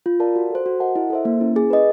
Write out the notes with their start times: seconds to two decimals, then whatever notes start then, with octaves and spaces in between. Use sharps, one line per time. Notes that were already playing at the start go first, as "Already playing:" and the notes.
0.06 F4
0.20 A#4 D5 F5 A5
0.36 F#4
0.50 A4 C5
0.66 F#4
0.80 A#4 D#5 F#5 A5
0.96 E4
1.10 A4 C5 E5
1.25 A#3
1.41 C#4 E4
1.56 G#4
1.70 B4 D#5